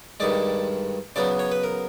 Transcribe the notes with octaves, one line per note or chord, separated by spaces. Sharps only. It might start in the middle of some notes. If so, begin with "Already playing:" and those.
G2 D#3 G#3 D5
C#3 F#3 B3 D5
C#5
B4
A#4